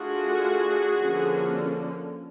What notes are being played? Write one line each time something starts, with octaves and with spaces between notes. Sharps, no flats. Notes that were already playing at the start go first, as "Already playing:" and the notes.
Already playing: A3 D4 F4 F#4 G#4
D3 F3 A#3 C#4